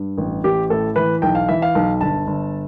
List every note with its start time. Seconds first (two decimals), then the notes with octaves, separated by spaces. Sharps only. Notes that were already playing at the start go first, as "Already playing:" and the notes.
Already playing: G2
0.18 A1
0.44 A1 G4
0.70 A2 A4
0.96 E3 B4
1.22 B1 G5
1.35 F5
1.49 E3 E5
1.62 F5
1.75 B1
2.01 G1 A5
2.27 G1